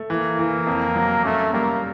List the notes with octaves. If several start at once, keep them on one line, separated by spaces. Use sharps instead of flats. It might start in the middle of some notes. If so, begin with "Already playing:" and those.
Already playing: A3
E3 A#3
E3
F2
F#3
A3 C#4
G3 A#3